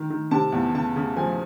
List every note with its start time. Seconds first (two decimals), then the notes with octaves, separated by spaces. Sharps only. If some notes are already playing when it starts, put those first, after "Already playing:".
Already playing: D#3
0.10 D#3
0.31 C3 A5
0.52 E2
0.74 C#3 A5
0.96 C#3
1.17 F3 G#5